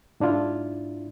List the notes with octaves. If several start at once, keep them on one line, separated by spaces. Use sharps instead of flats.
G#2 D4 E4 F4